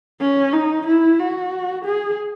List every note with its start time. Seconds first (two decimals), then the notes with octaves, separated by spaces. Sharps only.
0.21 C#4
0.53 D#4
0.87 E4
1.19 F#4
1.85 G#4